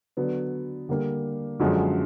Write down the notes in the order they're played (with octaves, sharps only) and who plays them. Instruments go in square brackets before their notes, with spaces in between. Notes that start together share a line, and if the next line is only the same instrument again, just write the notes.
[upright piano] D3 F#3 B3
D3 G3 A#3
F#2 D3 F3 G#3